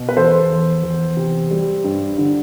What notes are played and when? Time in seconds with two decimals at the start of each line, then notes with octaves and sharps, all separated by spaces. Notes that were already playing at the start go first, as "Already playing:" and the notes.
Already playing: B2
0.09 B4
0.16 E2 A4 C5
0.50 E2
0.83 E2
1.17 C3
1.51 G3
1.84 G2
2.18 D3